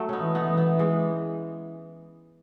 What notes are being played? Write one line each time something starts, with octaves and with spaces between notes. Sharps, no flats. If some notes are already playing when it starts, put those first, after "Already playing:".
Already playing: F#3 A3
B3 C#4 D#4
E3
B3 D#4
E3
B3 D#4
E3 G#3